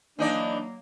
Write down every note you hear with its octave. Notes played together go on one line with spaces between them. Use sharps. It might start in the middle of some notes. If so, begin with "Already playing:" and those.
E3 F#3 A#3 D4 D#4 D5